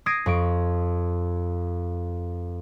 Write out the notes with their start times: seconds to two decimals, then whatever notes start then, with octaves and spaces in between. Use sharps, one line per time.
0.06 D#6 G#6 A#6 C7 D7 D#7
0.26 F2 C#6 D7